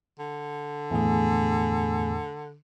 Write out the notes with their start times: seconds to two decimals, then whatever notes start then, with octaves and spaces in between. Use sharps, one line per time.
0.19 D3
0.91 E2 A2 A3 G#4 G#5